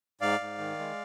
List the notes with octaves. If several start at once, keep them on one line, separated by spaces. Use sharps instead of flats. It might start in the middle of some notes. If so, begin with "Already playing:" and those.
G#2 D5 F5
G#2
D#3
G#3